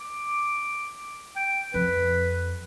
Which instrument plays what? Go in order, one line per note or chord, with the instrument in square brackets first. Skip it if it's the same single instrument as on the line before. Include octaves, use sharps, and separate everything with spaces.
[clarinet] D6
G5
[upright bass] F2 [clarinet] B4